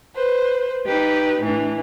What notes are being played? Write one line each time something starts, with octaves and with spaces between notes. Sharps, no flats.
B4 C5
D#4 G4 B4
A2 E3 D4